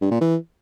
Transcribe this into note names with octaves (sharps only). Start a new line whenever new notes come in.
G2
A#2
E3